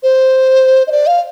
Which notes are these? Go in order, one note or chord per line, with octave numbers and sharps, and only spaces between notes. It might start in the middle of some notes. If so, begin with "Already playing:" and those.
C5
D#5
D5
F5